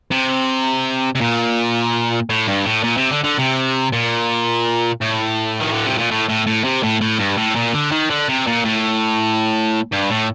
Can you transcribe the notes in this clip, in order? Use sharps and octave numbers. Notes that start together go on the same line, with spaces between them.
C3
C3
A#2
A2
G2
A2
A#2
C3
D3
D3
C3
A#2
A2
D#3
D3
C3
A#2
A2
A2
A2
C3
A2
A2
G2
A2
A#2
D3
D#3
D3
C3
A#2
A2
G2
A2